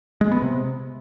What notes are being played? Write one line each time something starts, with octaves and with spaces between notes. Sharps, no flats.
G#3
B3
C3